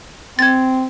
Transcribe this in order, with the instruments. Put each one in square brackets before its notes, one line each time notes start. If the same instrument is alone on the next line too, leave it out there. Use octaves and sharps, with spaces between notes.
[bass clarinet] C4 [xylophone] G#6 A6